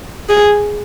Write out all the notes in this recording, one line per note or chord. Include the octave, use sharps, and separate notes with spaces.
G#4